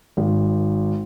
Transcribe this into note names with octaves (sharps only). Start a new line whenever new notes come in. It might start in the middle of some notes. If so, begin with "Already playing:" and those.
G#1